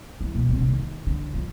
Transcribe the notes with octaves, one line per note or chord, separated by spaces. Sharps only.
E3
B2
C3
D3
D#3
D3
F3